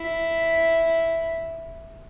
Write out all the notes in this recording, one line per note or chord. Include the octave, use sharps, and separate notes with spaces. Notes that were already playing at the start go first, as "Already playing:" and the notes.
Already playing: E4